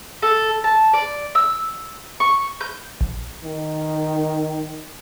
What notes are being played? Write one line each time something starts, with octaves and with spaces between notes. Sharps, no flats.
A4
A5
D5
E6
C#6
G6
A#1
D#3